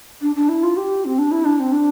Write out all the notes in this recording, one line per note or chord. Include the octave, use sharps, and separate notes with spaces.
D4
D4
E4
F4
G4
C4
D4
E4
D4
C4
D4